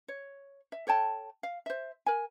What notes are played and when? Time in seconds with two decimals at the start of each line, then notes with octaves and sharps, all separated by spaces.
0.08 C#5
0.72 E5
0.87 A4 C#5 G5 A5
1.43 F5
1.66 C5 E5
2.06 A#4 G#5